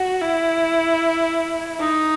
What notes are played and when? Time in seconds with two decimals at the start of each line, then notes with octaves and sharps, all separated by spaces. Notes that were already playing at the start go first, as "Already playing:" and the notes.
Already playing: F#4
0.22 E4
1.80 D#4